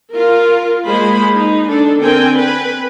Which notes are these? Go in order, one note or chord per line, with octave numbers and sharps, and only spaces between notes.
F4 A#4
G#3 A#3 G#4 C5 B5
D#4
D4 A4
D3 C4 A#4 G5 G#5
B4